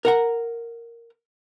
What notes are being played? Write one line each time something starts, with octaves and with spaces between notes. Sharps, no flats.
A#4 F#5 A#5